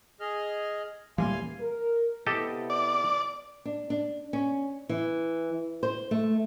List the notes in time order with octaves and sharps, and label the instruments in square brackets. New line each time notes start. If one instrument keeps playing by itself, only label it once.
[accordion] G#4 D#5 F6
[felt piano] D#1 [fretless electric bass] E3 F3 G3 [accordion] F5 G#5 C6
[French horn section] A#4
[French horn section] C3 B3 E4 [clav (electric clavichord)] G4 A4 D#5
[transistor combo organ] D5
[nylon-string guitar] D4
D4
C#4
E3
C5
A3